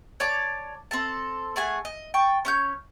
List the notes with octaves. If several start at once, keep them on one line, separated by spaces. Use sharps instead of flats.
C#5 D5 A5 D6
C4 A4 A5
A3 G#4 F#5 G#5
D#5
G5 A5 C#6
C#4 C#5 G6